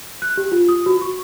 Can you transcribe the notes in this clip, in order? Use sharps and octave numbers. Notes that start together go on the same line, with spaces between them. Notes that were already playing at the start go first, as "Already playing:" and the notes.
F#6
G4
F4
D#6
F#4
C#6